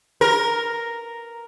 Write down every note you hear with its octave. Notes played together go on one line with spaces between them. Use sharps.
A#4